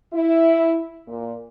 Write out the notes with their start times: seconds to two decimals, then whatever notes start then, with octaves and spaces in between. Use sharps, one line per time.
0.12 E4
1.07 A#2